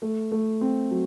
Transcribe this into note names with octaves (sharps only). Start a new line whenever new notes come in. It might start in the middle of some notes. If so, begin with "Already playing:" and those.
A3
A3
C4
F#3